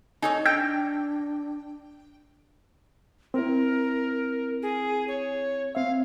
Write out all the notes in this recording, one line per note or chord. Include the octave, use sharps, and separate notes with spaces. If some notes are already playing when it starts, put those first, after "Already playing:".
D#4 A4 C#5 G#5
D4 G5 E6 G6 A#6
C4 E4 A#4
G#4
C#5
C4 E5 F5